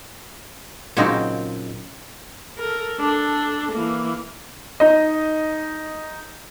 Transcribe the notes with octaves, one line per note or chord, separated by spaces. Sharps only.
A#2 C#3 F#3 C4 D#4
A4 A#4
D4 A4
E3 A#3
D#4 D#5